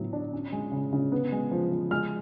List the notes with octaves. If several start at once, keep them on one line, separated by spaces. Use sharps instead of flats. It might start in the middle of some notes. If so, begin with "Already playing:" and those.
Already playing: A2 F#3 B3
D4
C#4
G#3
C#3
C#3
B3
G#3
F3
F3
G#3 F6